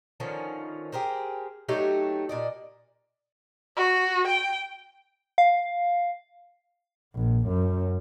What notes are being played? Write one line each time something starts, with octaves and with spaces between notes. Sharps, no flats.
D3 D#3 F3 C#4
G4 G#4 A#4 C5
F#3 A3 D#4 G4
A#2 D5 D#5
F#4
G5
F5
A#1
F#2